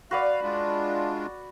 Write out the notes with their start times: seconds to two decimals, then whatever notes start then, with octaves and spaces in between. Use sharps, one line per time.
0.11 F#4 B4 D5 F5
0.43 G#3 D4 F4